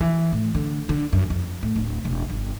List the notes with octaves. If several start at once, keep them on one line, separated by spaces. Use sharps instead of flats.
E3
A2
D3
D3
F#2
F2
A2
D1
E1
G1